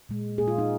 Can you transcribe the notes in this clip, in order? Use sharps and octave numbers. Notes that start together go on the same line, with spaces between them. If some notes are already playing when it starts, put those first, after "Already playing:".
A#2 G#3
A#2 A#3 G#4
F4
D#4